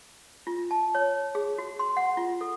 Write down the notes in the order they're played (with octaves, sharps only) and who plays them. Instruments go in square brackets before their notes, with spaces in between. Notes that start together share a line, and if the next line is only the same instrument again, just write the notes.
[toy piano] F4
A5
C#5
G#4
F#4
C6
F#5
F4
A4